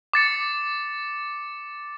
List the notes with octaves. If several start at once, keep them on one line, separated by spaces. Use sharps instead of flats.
D6 A6 C#7